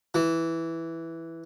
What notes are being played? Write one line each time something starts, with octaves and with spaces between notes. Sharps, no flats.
E3